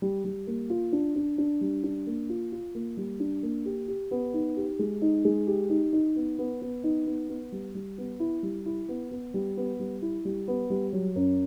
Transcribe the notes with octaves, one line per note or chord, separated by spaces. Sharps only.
G3
G3
A#3
F4
D4
D4
D4
G3
D4
A#3
F4
F4
A#3
G3
D4
A#3
G4
G4
B3
D#4
G4
G#3
D#4
G#3
G4
D#4
D#4
B3
B3
B3
D#4
B3
B3
G3
G3
B3
E4
G3
E4
B3
B3
G3
B3
G3
E4
G3
B3
G3
F#3
F#2